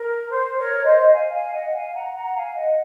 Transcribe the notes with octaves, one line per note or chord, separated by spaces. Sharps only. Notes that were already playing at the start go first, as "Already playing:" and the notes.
Already playing: A#4
C5
A#4 C#5
C5 D#5
F5 G#5
F5 G#5
D#5 F#5
F5 G#5
F#5 A#5
F#5 A#5
F5 G#5
D#5 F#5